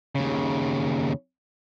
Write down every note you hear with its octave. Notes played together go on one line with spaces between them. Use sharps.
D#2 C#3